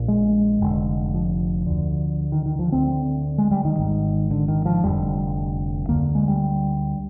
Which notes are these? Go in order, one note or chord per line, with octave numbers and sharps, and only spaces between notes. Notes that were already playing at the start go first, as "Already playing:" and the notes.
Already playing: A#1 A#2
G#3
F1 F2 D3
F3
D2 D3
D#3
D#3
F3
D2 D3 C4
G#3
G3
D#3
G#1 G#2
D3
D#3
F3
F1 F2 D3 G3
D2 D3 A#3
G#3
G3